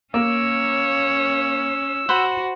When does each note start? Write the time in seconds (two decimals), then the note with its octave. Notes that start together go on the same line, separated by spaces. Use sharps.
0.14 A#3 C#4 C#5 E6
2.09 F#4 C5 F#5 B5